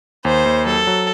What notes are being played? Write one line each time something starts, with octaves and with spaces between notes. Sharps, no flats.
D#2 C5
D#2
F#3 A4
F#3